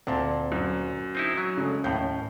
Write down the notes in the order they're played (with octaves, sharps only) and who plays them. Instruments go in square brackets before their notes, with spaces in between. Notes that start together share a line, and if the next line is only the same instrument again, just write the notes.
[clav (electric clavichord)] D2 A#2 [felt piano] C4 A5
[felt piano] F#2
[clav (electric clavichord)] C4 D#4 E4
F#3
[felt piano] C#3 G#3 A3
[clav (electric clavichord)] D#2 A2 [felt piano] C#4 G6